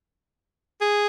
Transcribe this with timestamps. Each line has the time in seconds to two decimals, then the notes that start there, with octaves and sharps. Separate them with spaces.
0.81 G#4